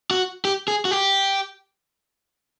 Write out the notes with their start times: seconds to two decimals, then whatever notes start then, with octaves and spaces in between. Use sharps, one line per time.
0.11 F#4
0.45 G4
0.68 G#4
0.85 F#4
0.91 G4